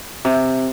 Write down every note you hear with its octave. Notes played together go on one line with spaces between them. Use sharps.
C3